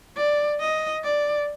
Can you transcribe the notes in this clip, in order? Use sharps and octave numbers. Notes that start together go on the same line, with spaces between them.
D5
D#5
D5